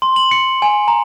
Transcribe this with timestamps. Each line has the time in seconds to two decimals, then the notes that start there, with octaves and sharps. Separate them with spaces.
0.02 C6
0.16 F#7
0.31 C#7
0.62 G#5
0.88 A#5